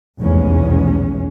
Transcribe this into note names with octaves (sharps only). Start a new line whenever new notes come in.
F1 B1 E2 G#2 G#3 C#4